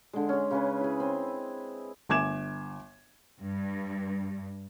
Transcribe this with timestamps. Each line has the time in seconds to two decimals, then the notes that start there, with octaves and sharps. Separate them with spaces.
0.13 D3 G#3
0.29 C#4 G#4
0.51 C#3 C#4 B4
0.81 E4 G#4
1.00 C4
2.09 G1 G#5 D6 G#6 E7
3.40 G2